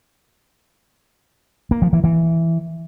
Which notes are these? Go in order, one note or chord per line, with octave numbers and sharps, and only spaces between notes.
A#3
F3
E3
E3